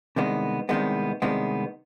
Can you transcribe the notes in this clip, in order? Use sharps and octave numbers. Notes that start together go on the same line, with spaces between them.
C2 C3 D#3 G#3 B3
C2 C3 D#3 G#3 B3
C2 C3 D#3 G#3 B3